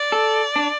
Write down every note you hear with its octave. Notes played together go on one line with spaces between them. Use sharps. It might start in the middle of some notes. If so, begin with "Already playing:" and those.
Already playing: D5
A4
D4